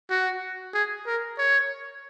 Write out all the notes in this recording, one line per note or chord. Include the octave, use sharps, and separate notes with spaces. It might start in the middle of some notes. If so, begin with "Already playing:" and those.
F#4
G#4
A#4
C#5